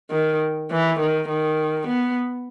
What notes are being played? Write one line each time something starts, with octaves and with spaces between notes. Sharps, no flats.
D#3
E3
D#3
D#3
B3